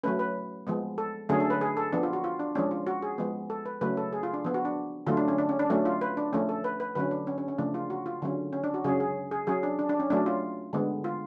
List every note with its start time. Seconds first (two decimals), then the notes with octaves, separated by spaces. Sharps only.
0.03 F#3 A3 C#4 B4
0.19 B4
0.67 F3 G#3 B3
0.98 A4
1.29 D3 F#3 A3 C#4 G#4
1.40 A4
1.50 B4
1.61 G#4
1.77 A4
1.93 F3 B3 D4
2.03 F4
2.13 F#4
2.24 F4
2.39 D4
2.55 F3 G#3 C#4 D4
2.71 F4
2.87 F#4
3.03 G#4
3.18 F3 G#3 B3
3.50 A4
3.66 B4
3.81 C#3 F#3 A3 B4
3.97 A4
4.13 G#4
4.23 F4
4.34 D4
4.44 F3 B3
4.54 F#4
4.65 D4
5.07 D3 F#3 A3 F4
5.17 D4
5.28 C#4
5.38 D4
5.49 C#4
5.59 D4
5.70 F#3 A3 C#4 D4
5.85 F4
6.01 B4
6.17 D4
6.33 F3 A3 C#4
6.49 A4
6.64 B4
6.80 B4
6.95 D3 F#3 C#4 B4
7.11 D4
7.27 C#4
7.38 C#4
7.48 C#4
7.58 C#3 F3 A3 D4
7.74 F4
7.90 F#4
8.06 F4
8.22 D3 F#3 C#4
8.53 C#4
8.64 D4
8.74 F#4
8.84 C#3 F#3 C#4 G#4
9.00 G#4
9.31 G#4
9.47 F#3 C#4 G#4
9.63 D4
9.79 D4
9.89 D4
10.00 C#4
10.10 F#3 A3 C#4 D4
10.26 F4
10.73 D3 G#3 B3
11.04 F4